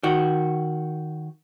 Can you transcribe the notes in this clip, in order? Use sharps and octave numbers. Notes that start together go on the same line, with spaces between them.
D#3 F#4